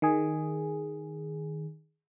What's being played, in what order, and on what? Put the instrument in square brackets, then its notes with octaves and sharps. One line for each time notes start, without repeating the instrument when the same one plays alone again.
[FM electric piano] D#3 G#4